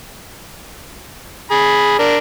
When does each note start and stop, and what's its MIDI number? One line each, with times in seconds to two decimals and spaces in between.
1.51 1.96 68
1.51 1.96 83
1.99 2.17 62
1.99 2.17 70